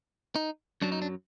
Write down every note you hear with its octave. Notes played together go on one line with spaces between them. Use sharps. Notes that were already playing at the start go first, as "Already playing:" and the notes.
D#4
F#2 F#3 D4
D#4
D4